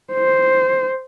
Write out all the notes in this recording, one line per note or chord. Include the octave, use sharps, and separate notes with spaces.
C5